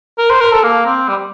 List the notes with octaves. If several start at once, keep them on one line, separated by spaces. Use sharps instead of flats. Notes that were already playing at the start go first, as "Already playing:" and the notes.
A#4
C5
A#4
A4
A#3
C4
G3